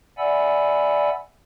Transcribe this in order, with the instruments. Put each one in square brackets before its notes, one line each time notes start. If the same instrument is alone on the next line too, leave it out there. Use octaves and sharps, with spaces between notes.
[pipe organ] D5 E5 F#5 G#5 B5 E6